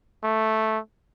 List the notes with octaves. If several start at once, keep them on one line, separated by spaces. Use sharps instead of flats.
A3